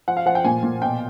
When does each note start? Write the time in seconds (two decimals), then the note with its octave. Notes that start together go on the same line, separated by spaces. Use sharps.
0.08 F3 F#5
0.17 F5
0.26 F3 F#5
0.35 G5
0.45 A#2 G#5
0.63 A#2
0.81 B2 G5